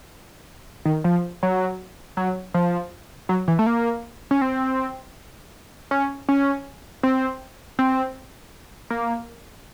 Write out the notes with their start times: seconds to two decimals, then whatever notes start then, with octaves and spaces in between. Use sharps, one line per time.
0.85 D#3
1.04 F3
1.43 F#3
2.17 F#3
2.54 F3
3.29 F#3
3.48 E3
3.59 A3
3.66 A#3
4.31 C#4
4.42 C4
5.91 C#4
6.29 C#4
7.03 C4
7.79 C4
8.90 A#3